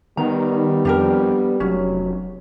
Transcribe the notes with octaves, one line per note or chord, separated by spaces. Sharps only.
D#3 G3 B3 A#5
F2 D4 G4 A#4
F1 F#3 C#4